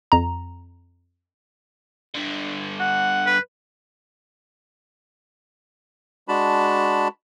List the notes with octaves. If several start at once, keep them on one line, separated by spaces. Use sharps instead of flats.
F2 A#5
G2 D3
F#5
B4
G#3 D4 F#4 A5 B5